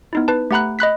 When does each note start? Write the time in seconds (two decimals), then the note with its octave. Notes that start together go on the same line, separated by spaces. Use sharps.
0.13 B3 D#4 E4
0.28 B4 A5
0.51 A3 G4 F#5 A#5 B5 F#6
0.79 D#5 B5 F#6 B6